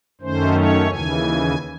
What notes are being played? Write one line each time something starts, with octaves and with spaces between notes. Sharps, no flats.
F#2 D#3 A3 C#4 C5
C#5
D#2 C#3 E3 G#5